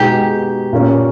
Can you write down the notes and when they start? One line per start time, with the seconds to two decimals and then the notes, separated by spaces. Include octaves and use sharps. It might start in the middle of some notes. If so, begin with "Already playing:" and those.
Already playing: B2 G#3 B3 D#4 G4 G#4
0.73 A#2 A#3 C#4